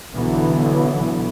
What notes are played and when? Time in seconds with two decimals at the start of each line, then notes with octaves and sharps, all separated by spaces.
0.15 B1 D3 E3 F#3 B3